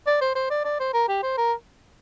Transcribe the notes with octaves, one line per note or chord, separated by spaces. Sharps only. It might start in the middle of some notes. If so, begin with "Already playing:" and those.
D5
C5
C5
D5
D5
C5
A#4
G4
C5
A#4